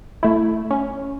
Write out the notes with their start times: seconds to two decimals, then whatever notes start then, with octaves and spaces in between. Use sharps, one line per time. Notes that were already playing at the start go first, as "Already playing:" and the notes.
0.23 A3 E4
0.71 C#4